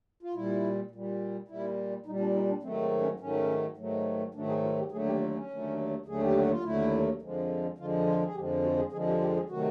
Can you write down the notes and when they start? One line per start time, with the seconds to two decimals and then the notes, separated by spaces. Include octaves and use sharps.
0.23 F4
0.34 A#2 G3 E4
0.91 A#2 G3
1.48 A#2 G3 E4
2.06 A#2 G3 D#4
2.20 D4
2.35 D#4
2.49 D4
2.62 G#2 D#3 F#3 A3 C4
2.81 C4
3.01 C#4
3.20 G#2 D#3 F#3 A3 C#4
3.77 G#2 D#3 F#3 A3
4.34 G#2 D#3 F#3 A3 D4
4.49 G#4
4.64 F4
4.78 G4
4.91 D#2 D3 F#3 A3 G#4
5.06 G4
5.20 F4
5.35 C#4
5.50 D#2 D3 F#3 A3
6.06 D#2 D3 F#3 A3 G#4
6.22 G4
6.36 F#4
6.50 F4
6.64 D#2 D3 F#3 A3 E4
7.22 F2 D3 F3 G#3
7.78 F2 D3 F3 G#3 F4
8.07 F4
8.26 G#4
8.35 F2 D3 F3 G#3 G4
8.64 F#4
8.78 G#4
8.92 F2 D3 F3 G#3 G#4
9.07 G4
9.21 G4
9.36 G#4
9.49 C3 D#3 F#3 A3 F#4